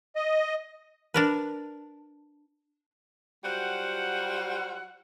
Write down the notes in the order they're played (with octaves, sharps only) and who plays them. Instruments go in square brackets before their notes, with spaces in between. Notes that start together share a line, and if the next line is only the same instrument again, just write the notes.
[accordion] D#5
[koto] D4 A#4 B4
[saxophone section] F#3 G3 F4 F#4 C5 F#5